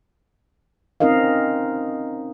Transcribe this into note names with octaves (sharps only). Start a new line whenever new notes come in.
C4 C#4 D#4 A#4 D#5 F5